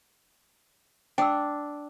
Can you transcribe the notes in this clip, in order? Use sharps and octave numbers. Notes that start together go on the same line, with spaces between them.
D4 G5 E6